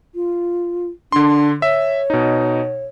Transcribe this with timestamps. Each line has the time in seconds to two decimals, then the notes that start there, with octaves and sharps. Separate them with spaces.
0.15 F4
1.12 D3 D4 C6
1.62 C#5 E5
2.10 B2 D#4